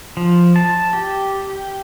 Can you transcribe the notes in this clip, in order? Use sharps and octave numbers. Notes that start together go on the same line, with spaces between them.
F3
A5
G4